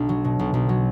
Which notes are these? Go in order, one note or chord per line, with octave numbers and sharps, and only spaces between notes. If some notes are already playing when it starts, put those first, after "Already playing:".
Already playing: B1 D4
F#3
B2
B1
B1
F#3